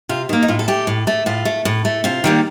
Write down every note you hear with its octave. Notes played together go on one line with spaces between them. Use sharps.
C3 F4
D#3 A#3
D#4
A2 F4
A4
A3 G4
A2
A3
A2 F4
A3
A2
A3
C3 F4
D#3 G3 A#3